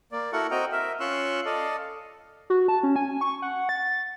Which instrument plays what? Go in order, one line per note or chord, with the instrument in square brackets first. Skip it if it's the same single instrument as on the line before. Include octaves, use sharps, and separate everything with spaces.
[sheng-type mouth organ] A#3 D5
E4 F#4 A4 A#4 F#5 C#6
C4 F#4 D#5 G5 A#5
A#4 E5
C#4 F4 C6 C#6 E6 F#6
A4 D5 D#5 F5
[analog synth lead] F#4
A5
C#4
G#5
C#6
F#5
A6